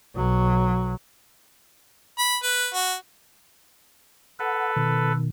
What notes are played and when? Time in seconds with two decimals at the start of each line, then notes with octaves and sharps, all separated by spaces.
0.15 B1 F#3
2.19 B5
2.43 B4
2.74 F#4
4.39 A4 B4 F#5
4.76 B2 D#3